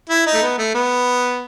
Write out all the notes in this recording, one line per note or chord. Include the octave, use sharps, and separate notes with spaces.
E4
D#4
A3
B3
A3
B3